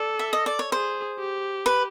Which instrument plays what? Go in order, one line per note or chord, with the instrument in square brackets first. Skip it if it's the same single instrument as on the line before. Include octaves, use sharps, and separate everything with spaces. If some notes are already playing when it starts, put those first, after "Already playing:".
Already playing: [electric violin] A4 [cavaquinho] D5
[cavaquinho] E5
D#5
D5
C#5
[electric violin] G#4 [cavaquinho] C5
[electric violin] G4
[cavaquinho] B4